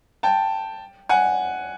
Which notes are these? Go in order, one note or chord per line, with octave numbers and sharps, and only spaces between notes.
G5 A5
F#5 G#5